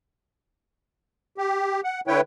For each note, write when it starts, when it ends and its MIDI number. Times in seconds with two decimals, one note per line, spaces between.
1.38 1.81 67
1.84 2.00 78
2.08 2.21 50
2.08 2.21 64
2.08 2.21 71
2.08 2.21 73
2.08 2.21 79